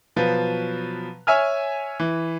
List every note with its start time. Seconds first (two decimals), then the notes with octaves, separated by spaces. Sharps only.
0.16 B2 F3 F#3 B4
1.27 C#5 E5 G#5 F6
2.00 E3